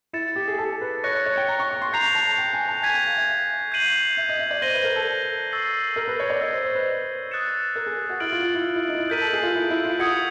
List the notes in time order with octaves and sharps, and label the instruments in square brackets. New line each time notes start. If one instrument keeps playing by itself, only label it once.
[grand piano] E4 [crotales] A6 C#7 E7
[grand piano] G4
G#4
A4
B4
[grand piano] C#5 [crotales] C#6 F#6 A#6 C#7
[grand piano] C#5
C#5
G5
A#5
C#6
C#6
C6
[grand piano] A#5 [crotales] G6 C7 F7
[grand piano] A5
G5
G#5
A5
[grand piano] G#5 [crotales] G#6 B6 D#7
[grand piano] G5
F5
E5
[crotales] G6 C7 D#7 F#7
[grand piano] E5
D#5
E5
D5
[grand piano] C5 [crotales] G6 A#6 D#7 G7
[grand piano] B4
A#4
A4
[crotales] C#6 E6 A6 C7
[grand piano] A#4
B4
C#5
D5
[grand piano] D#5 [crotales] E6 G#6 C7
[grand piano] C5
C5
B4
[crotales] D#6 F#6 A6 C#7 E7
[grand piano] A#4
G#4
F#4
[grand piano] E4 [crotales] F6 A6 D7 F#7
[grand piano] F4
F4
E4
E4
D#4
E4
[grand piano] A#4 [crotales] G6 B6 D#7 F#7
[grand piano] A4
G#4
F4
E4
E4
F4
[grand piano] F#4 [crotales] D#6 G#6 C#7